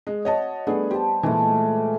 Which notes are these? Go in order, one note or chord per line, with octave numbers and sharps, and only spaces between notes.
G#3 D#5
F#4 C#5 D#5 A5
G3 A3 B3 D4 G#4
G4 C5 A5
A#2 E3 G#3 A3